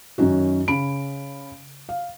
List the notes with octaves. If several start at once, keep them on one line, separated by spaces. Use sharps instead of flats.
F#2 D#3 C#4 D#4 F#4
C#3 C#4 B5 D7
F5